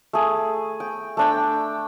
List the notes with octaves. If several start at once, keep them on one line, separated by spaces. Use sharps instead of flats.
A3 G#4
G5
A3 D4 G5